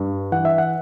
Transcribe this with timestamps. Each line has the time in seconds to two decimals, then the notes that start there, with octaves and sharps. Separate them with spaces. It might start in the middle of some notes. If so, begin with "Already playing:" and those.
Already playing: G2
0.32 E3 F#5
0.45 E5
0.58 F#5